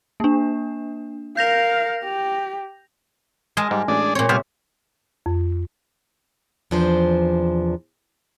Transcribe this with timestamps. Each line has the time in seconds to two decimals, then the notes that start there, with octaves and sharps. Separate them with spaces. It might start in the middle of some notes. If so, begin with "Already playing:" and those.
0.20 A#3 D4
1.37 A#4 F5 G6 A#6 F7
2.04 G4
3.57 G#3 G#4 A#4 D#5 A5
3.71 G#2 G3
3.88 A1 D4 G#4 D5
4.15 A#2 C4 C#5
4.29 C3 G3 B3 G4 C5 G#5 F6
5.26 F2
6.71 E2 C3 F3 D4 C5